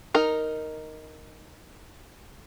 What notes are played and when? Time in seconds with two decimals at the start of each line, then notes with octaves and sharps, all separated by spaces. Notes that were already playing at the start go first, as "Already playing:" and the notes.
0.14 D#4 A#4